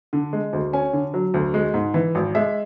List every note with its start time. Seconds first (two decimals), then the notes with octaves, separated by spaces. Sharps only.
0.13 D3
0.33 G#3
0.53 D2
0.73 C#4 G#5
0.93 D3
1.14 F#3
1.34 D2
1.54 G#3
1.74 G#2
1.94 E3
2.15 G#1
2.35 G#3 E5